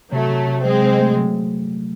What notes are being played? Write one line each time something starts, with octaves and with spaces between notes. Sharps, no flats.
C3 F#3 A3
C3
C3
F#3 G#3 C4
C3
A3
F#3